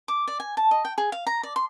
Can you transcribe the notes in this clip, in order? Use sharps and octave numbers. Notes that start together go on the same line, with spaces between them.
D6
D5
G#5
A5
D#5
G5
G#4
F5
A#5
D5
C6